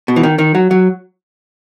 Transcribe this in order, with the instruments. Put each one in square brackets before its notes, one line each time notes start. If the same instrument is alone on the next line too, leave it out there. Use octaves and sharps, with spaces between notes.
[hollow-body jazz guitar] B2
E3
D#3
D#3
F#3
F#3